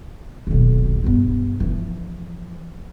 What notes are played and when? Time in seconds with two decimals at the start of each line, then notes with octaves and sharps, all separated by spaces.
0.47 D#1 B1
1.04 G2 B3
1.60 E3 F3